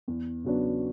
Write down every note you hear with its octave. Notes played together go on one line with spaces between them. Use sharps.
E2
C#3 F#3 B3 D4